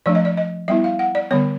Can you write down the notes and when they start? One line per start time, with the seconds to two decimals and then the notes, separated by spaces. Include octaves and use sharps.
0.06 F3 A3 D4 D5
0.15 D#5
0.25 D5
0.37 D#5
0.68 G3 B3 E4 E5
0.84 F5
0.99 F#5
1.15 D5
1.31 D3 G3 B3 C#5